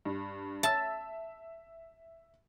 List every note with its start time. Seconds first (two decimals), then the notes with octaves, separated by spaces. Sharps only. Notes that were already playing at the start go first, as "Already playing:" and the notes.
0.05 G2
0.63 E5 A5 E6